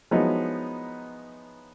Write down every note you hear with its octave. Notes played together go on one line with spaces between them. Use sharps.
F3 F#3 G#3 B3 D#4 E4